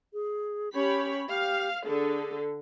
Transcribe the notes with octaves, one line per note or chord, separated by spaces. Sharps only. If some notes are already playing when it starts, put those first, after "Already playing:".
G#4
C#4 G4 C#5 B5
G4 F5
D3 G#4 A4